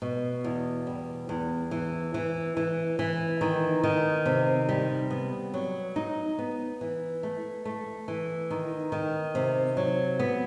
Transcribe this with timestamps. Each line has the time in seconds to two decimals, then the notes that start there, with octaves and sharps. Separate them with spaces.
0.02 B2
0.44 E2
0.87 G3
1.29 E2
1.71 E3
2.14 E3
2.57 E3
2.99 E3
3.41 D#3
3.84 D#3
4.26 C3
4.69 G3
5.10 B3
5.54 F#3
5.96 D#4
6.38 B3
6.81 E3
7.23 A3
7.65 A3
8.08 E3
8.50 D#3
8.92 D#3
9.35 C3
9.77 F#3
10.19 B3